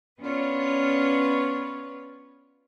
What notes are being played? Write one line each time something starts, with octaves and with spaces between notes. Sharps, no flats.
B3 C#4 D4 F4 B4 C#5